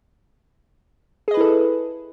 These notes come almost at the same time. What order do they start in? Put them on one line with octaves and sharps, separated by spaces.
G#4 D#5 B4 E4 A4